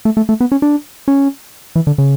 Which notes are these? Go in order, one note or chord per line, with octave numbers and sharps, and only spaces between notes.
A3
A3
A3
B3
C#4
D4
C#4
E3
D3
C#3